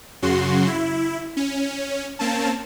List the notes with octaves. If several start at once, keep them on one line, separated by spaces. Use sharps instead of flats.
F#2 C#3 F#4 C6
E4
C#4
A#3 C4 C#4 A5